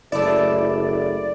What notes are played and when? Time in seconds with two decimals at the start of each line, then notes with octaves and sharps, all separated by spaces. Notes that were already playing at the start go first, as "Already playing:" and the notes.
0.12 F#1 A3 E4 D5